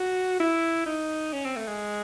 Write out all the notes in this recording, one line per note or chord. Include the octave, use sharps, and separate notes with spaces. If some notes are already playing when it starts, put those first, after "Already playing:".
Already playing: F#4
E4
D#4
C#4
C4
A3
G#3